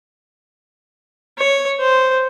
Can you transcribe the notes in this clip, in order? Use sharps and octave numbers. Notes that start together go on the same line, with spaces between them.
C#5
C5